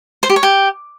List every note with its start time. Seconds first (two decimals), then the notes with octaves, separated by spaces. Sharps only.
0.23 C5
0.30 G4
0.36 C#5
0.43 G4